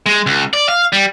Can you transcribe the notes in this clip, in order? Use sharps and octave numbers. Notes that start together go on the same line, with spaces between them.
G#3
C#2
D5
F5
G3